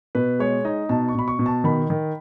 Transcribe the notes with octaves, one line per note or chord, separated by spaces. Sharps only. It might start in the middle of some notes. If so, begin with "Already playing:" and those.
B2 B4
G#3 C#5
D#4 D#5
B2 A5
C#6
B2 B5
C#6
B2
A5
D#3 B5
D#3